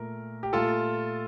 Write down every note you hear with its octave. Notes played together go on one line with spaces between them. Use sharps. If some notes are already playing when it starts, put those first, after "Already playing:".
Already playing: A#2 A3 A#4
G4
A#2 A3 F4 A4